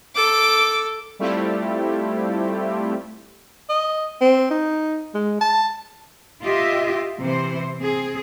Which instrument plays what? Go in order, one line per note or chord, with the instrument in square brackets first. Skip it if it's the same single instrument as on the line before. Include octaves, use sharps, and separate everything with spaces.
[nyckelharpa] A4 [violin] D6
[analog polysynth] G3 A3 C4 E4 F4 G4
[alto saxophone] D#5
C4
D#4
G#3
A5
[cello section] F4 G4 D#5 E5
C3 E3 C5
C4 G#4